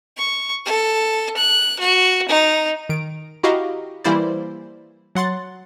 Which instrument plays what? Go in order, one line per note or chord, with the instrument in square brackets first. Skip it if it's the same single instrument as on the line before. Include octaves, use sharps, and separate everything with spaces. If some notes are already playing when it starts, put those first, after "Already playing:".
[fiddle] C#6
A4
F#6
F#4
D#4
[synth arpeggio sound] D#3 D7
E4 F#4 G4 D#5 F5 A#5
E3 G3 A#3 E4 C5 D5
F#3 F#5 C6 A6